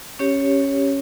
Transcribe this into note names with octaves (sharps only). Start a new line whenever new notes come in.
C#4 G4 C#5